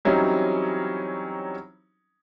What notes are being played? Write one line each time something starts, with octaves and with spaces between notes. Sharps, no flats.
E3 F#3 G3 C4 C#4 D#4